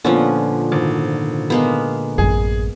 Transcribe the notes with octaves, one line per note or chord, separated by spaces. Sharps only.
A#2 D3 F3 B3 C#4
G#1
G#3 A#3 B3
A1 F#2 G#4